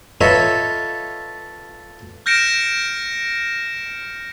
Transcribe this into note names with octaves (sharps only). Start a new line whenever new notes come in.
F4 A4 B4 C#5 D#5 E5
F6 G6 A#6 C#7 D7 E7